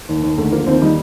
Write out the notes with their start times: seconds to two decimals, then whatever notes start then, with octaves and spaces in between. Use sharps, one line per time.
0.09 D#2
0.23 D#2
0.38 D3 A3
0.53 F3 A#3
0.67 D#2 C4
0.81 G3 D#4